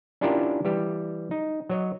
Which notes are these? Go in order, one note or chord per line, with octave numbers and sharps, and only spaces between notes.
C#4 D4 E4 F4 G4 A#4
E3 G3 G4
D#4
F#3 C#5 D#5